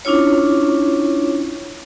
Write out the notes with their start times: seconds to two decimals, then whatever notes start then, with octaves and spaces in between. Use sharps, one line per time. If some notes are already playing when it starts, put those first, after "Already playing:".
0.05 C#4 D4 E4 F4 C#5